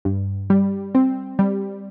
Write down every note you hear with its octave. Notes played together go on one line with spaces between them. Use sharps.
G2
G3
C4
G3